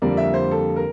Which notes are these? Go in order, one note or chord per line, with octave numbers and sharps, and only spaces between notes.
F2 D3 G3 A#3 D5
E5
C5
A4
A#4